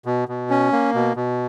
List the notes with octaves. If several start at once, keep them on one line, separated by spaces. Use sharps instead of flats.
B2
B2
C#4
A#3
B2
B2